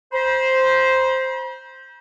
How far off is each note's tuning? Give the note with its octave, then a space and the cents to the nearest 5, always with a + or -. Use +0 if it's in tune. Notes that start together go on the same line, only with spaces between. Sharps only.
C5 +0 B5 -45